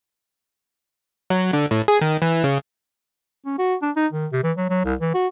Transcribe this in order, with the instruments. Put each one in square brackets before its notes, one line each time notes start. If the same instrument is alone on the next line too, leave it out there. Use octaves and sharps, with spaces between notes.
[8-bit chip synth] F#3
D3
A2
G#4
D#3
E3
C#3
[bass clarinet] C#4
F#4
D4
D#4
D#3
C3
E3
F#3
F#3
C2
E3
F#4